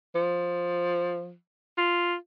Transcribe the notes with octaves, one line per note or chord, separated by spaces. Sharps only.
F3
F4